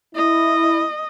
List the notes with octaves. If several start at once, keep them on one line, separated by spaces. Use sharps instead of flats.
E4 D#5